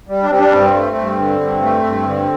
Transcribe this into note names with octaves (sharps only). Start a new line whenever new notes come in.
G3
D4
G3 C4
D4
G2 C4
A3
G2
D3
G2
A3
G2
D3